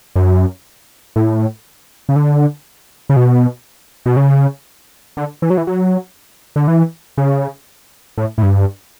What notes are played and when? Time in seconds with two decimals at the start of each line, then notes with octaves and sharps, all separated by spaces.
0.15 F#2
1.16 A2
2.09 C#3
2.16 D3
3.09 C#3
3.16 B2
4.06 B2
4.17 C#3
5.17 D3
5.42 E3
5.50 F#3
5.57 E3
5.67 F#3
6.56 D3
6.68 E3
7.18 C#3
8.18 A2
8.38 A2
8.43 G2